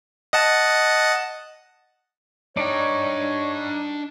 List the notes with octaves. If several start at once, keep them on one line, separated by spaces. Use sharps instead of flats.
D#5 F#5 A5
D4 D#4 C#5 D5 G5